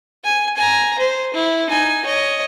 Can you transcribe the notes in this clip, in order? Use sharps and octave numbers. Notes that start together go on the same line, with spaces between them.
G#5
G#5 A#5
C5
E4
D#4 G#5
C#5 D#5